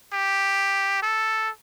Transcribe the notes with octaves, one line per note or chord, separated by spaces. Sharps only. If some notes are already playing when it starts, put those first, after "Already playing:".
G4
A4